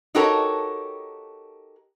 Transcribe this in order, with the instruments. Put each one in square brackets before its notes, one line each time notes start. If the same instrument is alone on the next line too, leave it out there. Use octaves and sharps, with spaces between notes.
[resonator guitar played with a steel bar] D#4 F#4 G4 A4 A#4 C#5